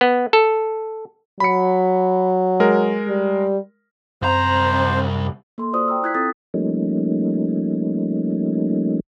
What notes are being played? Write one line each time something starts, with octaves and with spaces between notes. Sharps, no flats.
B3
A4
F#3 B5 C#7
G#3 A#4
G3
C2 F#2 C4 C5 A#5
A#3 A4 C6
F4 F#4 C5 D5 D#6
G5 A#5 E6
E4 F#6 G#6 B6
C4 F4 A4 D#6 A6
F3 G3 A3 A#3 C#4 D#4